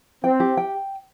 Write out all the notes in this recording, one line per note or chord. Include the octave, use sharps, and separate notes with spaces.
C4 G5
G4
G5